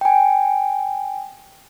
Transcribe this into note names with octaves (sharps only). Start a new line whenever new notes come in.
G5 G#5